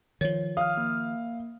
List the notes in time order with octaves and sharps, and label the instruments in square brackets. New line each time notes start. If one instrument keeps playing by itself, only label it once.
[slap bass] D#3 F3 [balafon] C#5
[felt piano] F5 [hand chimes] D#6 F6
[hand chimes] A#3